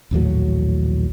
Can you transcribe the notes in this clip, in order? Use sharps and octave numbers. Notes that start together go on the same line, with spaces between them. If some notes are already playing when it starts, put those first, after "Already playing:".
A#1 D#2 A2 F#3